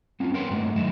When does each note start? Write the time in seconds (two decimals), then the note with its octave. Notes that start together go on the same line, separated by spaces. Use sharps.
0.20 C4 C#4 F4
0.34 A#4 B4 C#5 F#5 G5 C6
0.49 G2 G#3 A3 F#5
0.76 A2 D#3 F#3 D#5 E5